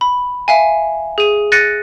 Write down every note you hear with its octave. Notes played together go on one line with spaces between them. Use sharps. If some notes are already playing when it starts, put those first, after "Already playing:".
B5
E5 F5 G#5
G#4 D#7
F#6 A6 A#6 C#7 D#7